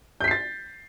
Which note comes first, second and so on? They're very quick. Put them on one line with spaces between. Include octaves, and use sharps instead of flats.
G6 B6 C7 A6